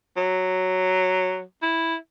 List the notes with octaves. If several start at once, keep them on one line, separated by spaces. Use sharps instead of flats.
F#3
E4